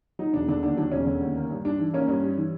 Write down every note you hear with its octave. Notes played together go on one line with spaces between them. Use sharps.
F#3 D#4
E1 D4
D3 D4
D#2 D4
F#3 D4
E1 C#4
D3
D#2
A#3
G2
G3 D4
E3
A#3 C#4
G2
G3
E3